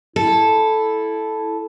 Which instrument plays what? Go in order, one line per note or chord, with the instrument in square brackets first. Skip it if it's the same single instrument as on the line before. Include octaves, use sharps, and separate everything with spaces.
[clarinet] E4 [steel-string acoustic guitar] A4